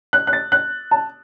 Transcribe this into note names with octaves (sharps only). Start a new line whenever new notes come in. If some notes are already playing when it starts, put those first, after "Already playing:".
F#6
F#6
A6
F#6
A5